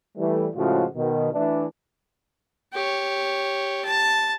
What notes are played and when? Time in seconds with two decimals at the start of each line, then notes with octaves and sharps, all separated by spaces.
0.17 E3 G3 A3
0.56 A2 C#3 F3 G#3 F4 F#4
0.95 B2 D#3
1.33 E3 A3 D4
2.74 G4 C#5
3.85 A5